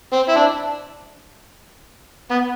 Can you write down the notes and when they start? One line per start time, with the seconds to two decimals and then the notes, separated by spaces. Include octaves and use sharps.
0.12 C4
0.29 E4
0.36 D4
2.31 B3